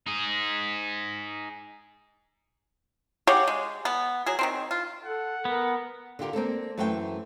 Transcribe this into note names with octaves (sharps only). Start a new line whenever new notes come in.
D#4 G#4
C#3 G4 C#5 F#5
G#3
B3
F#3 G#4
D#3 F#3 C4
F4
A4 F#5
B3 A#4
D3 F4 G4 A#4
A#3 C4 D4 A4
F#2 E3 A3 C5 E5 G5